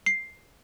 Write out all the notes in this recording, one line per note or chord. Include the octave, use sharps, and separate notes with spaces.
C7